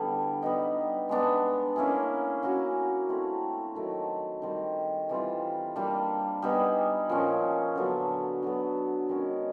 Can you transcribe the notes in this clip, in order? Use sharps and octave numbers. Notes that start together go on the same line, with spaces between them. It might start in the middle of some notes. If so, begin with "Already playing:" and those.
Already playing: D3 G3 B3 E4
G3 B3 D#4
G#3 B3 D4
A#3 C#4 E4 G#4
A#3 C#4 F#4
A3 C4 E4
D#3 F#3 A3
D#3 G3 C4
E3 G3 C4 F4
G3 A#3 D4
G3 B3 D#4 G#4
A#2 F3 A#3 C#4
D3 F#3 B3 D4
D3 F#3 B3
D#3 G#3 C#4